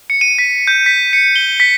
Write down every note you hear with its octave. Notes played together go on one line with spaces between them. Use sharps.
C#7
D#7
B6
G6
B6
C#7
G7
B6